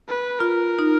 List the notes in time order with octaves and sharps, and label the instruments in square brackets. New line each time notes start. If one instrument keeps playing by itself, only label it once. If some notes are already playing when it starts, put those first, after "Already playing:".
[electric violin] B4
[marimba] F4 [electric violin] A#4
[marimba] D#4